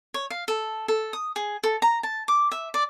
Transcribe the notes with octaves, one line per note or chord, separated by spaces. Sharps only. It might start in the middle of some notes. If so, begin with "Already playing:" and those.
C#5
F5
A4
A4
D#6
G#4
A4
A#5
A5
D6
E5
D5